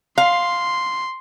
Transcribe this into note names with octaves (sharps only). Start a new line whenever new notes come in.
F5 C6